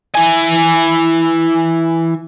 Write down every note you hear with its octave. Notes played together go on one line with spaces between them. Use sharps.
E3 G#5